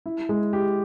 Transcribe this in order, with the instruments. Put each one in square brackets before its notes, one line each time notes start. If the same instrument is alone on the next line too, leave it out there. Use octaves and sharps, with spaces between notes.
[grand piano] E4
G#3
G4